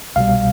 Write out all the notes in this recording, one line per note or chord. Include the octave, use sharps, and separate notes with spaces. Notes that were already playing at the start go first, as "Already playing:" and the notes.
C2 B2 G3 F5